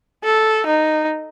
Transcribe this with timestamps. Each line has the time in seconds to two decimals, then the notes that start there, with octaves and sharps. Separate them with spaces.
0.24 A4
0.67 D#4